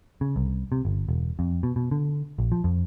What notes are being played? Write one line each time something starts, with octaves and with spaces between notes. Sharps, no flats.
C#3
C2
C3
G1
E1
F2
B2
B2
D3
A#1
F3
F2